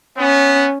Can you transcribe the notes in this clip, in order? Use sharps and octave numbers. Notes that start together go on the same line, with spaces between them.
B3 C#4